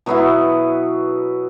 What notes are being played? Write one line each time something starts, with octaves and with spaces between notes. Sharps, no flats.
B2 F#3 B3 E4